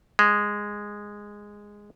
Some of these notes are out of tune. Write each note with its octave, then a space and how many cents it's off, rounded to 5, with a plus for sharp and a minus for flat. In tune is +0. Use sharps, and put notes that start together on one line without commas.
G#3 -10